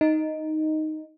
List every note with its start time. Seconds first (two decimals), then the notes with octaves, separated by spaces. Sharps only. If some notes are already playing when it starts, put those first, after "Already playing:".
0.01 D#4